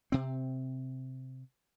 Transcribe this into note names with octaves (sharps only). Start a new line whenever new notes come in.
C3 C4